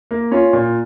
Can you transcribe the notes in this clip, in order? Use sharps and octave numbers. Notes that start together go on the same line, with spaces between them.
A#3
C#4 F4
A#2